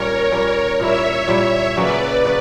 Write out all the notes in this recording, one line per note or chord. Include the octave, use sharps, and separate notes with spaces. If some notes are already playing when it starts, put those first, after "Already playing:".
Already playing: A#2 G3 A#3 C#4 A#4 C#5
A#2 G3 A#3 C#4
A#2 G3 A#3 E4 C#5 E5
A#2 G3 A#3 E4
C#3 F#3 A#3 C#4 B4 D5
C#3 F#3